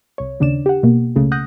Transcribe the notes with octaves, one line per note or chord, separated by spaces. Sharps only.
C2 C#5
D#2 C#3 D4 D5 E7
G4 F#5
B2 A#3
C#2 C#3 A3
F#5 D#6 F#6 G6 A#6